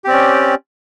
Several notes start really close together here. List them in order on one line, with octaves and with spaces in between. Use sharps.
G4 C4 D5 C#4